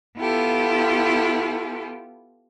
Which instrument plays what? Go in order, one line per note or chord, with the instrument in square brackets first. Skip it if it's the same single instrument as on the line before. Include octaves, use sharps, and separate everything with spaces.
[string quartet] B3 E4 F4 G4 A4